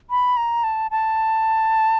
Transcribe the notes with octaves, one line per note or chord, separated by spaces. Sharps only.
B5
A#5
A5
A5